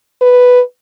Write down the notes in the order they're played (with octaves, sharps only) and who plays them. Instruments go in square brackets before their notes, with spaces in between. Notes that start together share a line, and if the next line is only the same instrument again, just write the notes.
[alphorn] B4